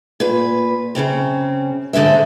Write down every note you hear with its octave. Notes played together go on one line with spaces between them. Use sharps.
A#2 B4
F#2 A2 C#3 C4
G#2 D3 G#3 C5 E5